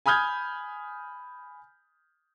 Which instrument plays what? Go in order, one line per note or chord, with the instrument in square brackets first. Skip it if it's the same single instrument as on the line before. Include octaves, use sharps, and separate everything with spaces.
[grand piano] G#5 B5 D#6 F6 G6 G#6